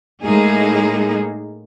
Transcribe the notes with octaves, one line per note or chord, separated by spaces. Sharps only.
A2 G#3 A#3 D#4 G#4